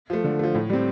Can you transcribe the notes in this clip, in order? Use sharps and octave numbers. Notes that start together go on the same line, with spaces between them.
F3 A3
D3
F3 A3
A2
G3 C4